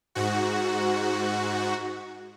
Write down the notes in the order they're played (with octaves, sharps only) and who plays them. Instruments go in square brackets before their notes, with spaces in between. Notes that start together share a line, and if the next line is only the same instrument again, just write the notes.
[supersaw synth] G#2 F#4